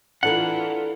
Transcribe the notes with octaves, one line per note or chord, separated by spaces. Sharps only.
E3 D4 F4 A4 A#4 F#5